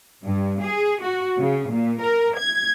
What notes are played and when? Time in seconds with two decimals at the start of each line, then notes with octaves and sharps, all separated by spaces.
0.23 G2
0.62 G#4
1.02 F#4
1.40 C#3
1.71 A#2
2.00 A#4
2.37 G#6